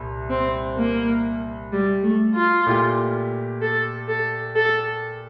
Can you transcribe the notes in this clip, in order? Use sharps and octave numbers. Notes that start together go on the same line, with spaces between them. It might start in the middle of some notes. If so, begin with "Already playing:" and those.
Already playing: C2 A#2
C4
A#3
G3
A3
F4
A#2 A3 E4 G4
A4
A4
A4